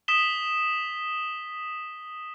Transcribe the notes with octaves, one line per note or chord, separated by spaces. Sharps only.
D#6 B6 E7 G7